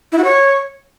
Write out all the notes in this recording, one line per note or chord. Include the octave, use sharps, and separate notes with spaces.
E4
F#4
C#5